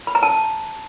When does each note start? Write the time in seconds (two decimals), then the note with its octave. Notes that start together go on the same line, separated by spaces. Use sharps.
0.07 B5
0.15 A#5
0.23 A5